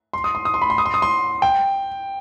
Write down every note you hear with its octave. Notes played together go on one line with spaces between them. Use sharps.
C6
D#6
C6
D#6
C6
B5
C6
D#6
C6
D#6
C6
G5